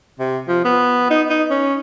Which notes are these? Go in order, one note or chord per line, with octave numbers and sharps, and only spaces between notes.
C3
F3
B3
D#4
D#4
C#4